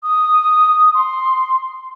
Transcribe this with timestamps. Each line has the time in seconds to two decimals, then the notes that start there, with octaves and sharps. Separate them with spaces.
0.03 D#6
0.94 C6